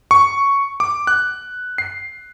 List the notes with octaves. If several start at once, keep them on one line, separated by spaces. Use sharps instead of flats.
C#6
D6
F#6
C7